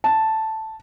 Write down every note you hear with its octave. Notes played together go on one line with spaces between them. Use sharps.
A5